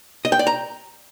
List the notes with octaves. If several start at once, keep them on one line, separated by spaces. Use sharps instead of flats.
D#5
G5
D5
A#5